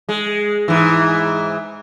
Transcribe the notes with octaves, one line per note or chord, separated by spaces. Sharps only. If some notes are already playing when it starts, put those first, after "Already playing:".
G#3
G#2 E3